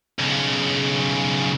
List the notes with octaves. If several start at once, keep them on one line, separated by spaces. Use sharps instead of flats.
B1 C#3